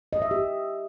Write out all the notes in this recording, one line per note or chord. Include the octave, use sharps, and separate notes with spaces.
D#5
E5
G4